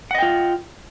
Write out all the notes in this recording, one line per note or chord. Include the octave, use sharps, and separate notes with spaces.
F4 D#5 F#5 G5